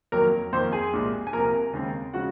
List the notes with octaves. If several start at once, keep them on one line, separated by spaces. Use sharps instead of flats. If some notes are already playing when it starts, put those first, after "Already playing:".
F2 D#3 F#3 A#3 A#4 A#5
F2 D#3 A#3 C5 C6
G#4 G#5
C2 A#2 G#3
G#5
C2 C3 F3 A#3 A#4 A#5
D#2 C#3 G#3 C4
C#3 F3 G#3 F#4 F#5